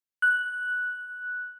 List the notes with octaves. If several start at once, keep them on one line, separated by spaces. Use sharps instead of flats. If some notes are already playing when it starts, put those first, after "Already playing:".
F#6